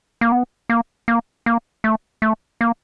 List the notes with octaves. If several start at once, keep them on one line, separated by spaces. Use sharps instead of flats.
A#3
B3
A#3
A#3
A#3
A3
A3
A#3